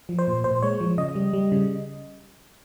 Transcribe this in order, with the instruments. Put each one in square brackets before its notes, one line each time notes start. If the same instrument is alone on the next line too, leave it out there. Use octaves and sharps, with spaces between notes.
[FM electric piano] F3
C5
A#2
A#2 C5
G#3 C#5
F3
C#3 D#5
G3
G3
C#3